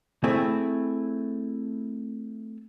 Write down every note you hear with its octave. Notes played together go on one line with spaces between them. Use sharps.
A3 C4 E4 G#4